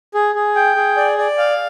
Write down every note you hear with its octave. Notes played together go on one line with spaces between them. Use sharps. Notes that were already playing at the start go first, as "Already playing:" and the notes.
G#4
G#4
G5
G#4
D5
D5
F5